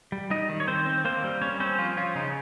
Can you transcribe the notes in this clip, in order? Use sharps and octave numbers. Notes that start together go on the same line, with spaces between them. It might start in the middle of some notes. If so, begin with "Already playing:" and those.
G3
G3 D#4 D#5
D#3
C#5
D#3 C4 C5
C4
A#3 C4 C5
G3
G3 C#4 C#5
C4 C#4 C5
F3 F4
C#4 F4
C#3 D#4